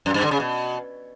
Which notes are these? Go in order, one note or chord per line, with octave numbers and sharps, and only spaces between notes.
F#2
G2
D3
C#3
B2